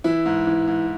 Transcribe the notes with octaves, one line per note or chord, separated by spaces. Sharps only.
E3 E4
G#2
E3
G#2